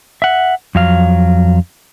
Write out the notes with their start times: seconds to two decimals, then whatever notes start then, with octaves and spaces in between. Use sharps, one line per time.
0.22 E5 F#5
0.75 F2 F#3 F5